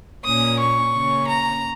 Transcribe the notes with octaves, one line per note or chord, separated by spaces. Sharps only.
A#2 A#3 C#4 D#6
C#6
C#3 A#3 C#4
A#5